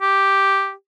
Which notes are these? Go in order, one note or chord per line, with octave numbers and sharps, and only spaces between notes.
G4